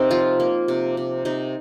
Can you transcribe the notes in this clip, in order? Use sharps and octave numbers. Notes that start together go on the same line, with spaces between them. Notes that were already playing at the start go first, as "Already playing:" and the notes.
Already playing: C3 C4 D#4 A#4
F3 F4
A#3
C3
C3
C3 D#4